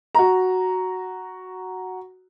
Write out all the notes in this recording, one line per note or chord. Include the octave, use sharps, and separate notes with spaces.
F#4 A#5